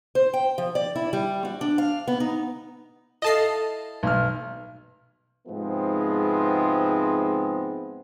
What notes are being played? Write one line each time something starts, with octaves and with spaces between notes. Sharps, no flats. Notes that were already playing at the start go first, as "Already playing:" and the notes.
C5
G5
F3
D5
E4
G3
F#4
D4
F5
B3
D#4
E4 A4 D#5 F5 A5 C7
B1 F6
G#2 C3 F3 G#3 B3 C4